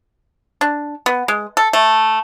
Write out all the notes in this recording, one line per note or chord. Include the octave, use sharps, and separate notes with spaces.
D4
B3
G#3
A4
A3